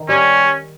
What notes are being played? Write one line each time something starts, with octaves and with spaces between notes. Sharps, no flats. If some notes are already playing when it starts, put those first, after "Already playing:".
Already playing: D#3
G3 C#4